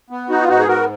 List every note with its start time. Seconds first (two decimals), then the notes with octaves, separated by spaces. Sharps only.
0.10 B3
0.30 D#4 F#4
0.41 F4
0.49 G#2 D#4 F#4
0.60 G#4
0.68 F#4 A#4